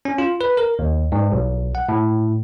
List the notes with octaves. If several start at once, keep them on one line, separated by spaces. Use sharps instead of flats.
C#4
F4
B4
A#4
D#2
G#2
B1
F#5
A2